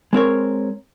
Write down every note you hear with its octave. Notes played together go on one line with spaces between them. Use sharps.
G#3 C4 A#4 C#5